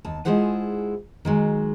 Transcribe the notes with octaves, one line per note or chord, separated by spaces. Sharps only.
D#2 A5
G#3 E4 F4 G#4 C5 F#5
D#3 F#3 G#3